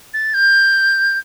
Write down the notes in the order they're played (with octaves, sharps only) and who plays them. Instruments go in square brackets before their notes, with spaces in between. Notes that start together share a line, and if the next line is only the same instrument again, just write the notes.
[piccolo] A6
G6